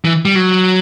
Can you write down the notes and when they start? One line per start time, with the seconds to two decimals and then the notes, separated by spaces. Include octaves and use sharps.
0.05 E3
0.25 G3
0.35 F#3